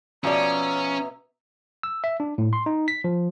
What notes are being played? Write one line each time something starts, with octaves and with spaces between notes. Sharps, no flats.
B2 F3 C#4 D5 E5 A#5
E6
E5
D4
A2
C6
D#4
B6
F3